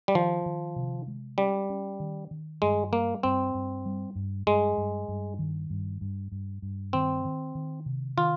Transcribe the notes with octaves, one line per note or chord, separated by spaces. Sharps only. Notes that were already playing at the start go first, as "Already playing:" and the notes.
G3
D#3 F3
D#3
C3
G#3
G3 C#4
C#4
D#3
D#3
G2 G#3
G3 A#3
G2 C4
G2
G3
G2
G2 G#3
G2
G2
D#3
G2
G2
G2
G2
D#3 C4
D#3
D#3
C3
D#3 F4